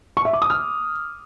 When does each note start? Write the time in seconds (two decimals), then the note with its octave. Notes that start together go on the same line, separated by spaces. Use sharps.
0.17 C#6
0.25 E5
0.33 D6
0.42 D#6
0.50 F6